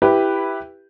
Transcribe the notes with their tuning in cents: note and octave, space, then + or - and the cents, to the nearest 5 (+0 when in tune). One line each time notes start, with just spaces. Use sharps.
E4 +0 G4 +0 B4 +0